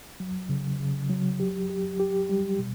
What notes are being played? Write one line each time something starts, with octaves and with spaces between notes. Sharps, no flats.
F#3
C#3
C#3
F#3
G4
G4
G4
G3
B2